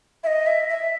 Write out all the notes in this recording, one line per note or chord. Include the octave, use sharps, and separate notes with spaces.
E5
D#5
E5
E5